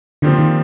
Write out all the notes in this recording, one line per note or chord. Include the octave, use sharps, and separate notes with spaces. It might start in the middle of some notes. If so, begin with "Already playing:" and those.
A#2 D3 F3 C4 G4
D#3